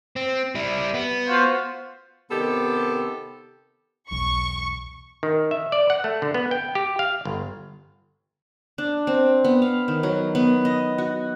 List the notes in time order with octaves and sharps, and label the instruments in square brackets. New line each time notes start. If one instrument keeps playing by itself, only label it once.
[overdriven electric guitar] C4
G3 E4
B3
[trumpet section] F4 F#4 C5
[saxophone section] C3 D#3 B3 G4 A4
[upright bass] B1 E2 [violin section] C#6
[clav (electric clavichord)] D#3
E5
D5
F#5
A3
D3
B3
G5
G4
F5
G1
[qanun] D4
C4
B3
F5
D#3
F#3
B3
D#5
F#4